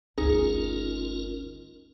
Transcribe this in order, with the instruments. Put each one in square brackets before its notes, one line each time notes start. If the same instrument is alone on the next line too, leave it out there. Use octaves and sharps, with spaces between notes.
[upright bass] G1 D2 [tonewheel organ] C#4 F4 A#4 [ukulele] D#4 [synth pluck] G#4